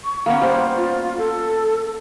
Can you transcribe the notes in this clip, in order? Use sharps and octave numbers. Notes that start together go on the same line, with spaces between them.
C#6
A#3 B3 C#4 F#5
G3 C5
F4
A4